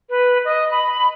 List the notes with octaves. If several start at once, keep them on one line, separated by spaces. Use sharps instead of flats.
B4
D#5
B5